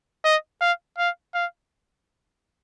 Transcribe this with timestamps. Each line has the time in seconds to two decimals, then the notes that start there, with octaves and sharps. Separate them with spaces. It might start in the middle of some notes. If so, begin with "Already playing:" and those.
0.25 D#5
0.61 F5
0.98 F5
1.35 F5